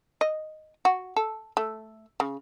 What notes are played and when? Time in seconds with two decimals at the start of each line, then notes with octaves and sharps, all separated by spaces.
0.21 D#5
0.85 F#4
1.16 A4
1.57 A3
2.20 C#3